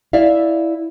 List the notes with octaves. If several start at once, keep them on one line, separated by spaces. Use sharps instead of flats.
E4 D5 E5 F5